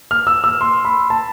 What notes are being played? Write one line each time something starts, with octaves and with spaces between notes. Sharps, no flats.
F6
E6
E6
C6
B5
A5